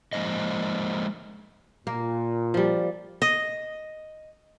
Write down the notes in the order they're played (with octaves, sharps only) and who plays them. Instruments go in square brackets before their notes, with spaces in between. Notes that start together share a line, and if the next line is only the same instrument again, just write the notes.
[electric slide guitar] F3 G#3 A#3 C5 D#5
[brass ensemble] A#2 [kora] A#3
[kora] F3 G3
D#5